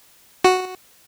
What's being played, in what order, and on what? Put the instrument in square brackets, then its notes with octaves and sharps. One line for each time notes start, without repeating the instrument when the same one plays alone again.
[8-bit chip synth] F#4